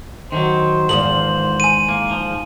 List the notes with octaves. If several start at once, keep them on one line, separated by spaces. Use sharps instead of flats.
D#3 E3 F#3 C5
E2 G#2 D#3 F3 F#7
G#5 D#7
A#3
F3